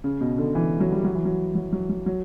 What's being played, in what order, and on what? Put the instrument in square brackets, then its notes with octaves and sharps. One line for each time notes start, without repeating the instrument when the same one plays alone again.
[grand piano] C#3
B2
D3
E3
F#3
G3
F#3
E3
F#3
F#3
F#3
F#3
F#3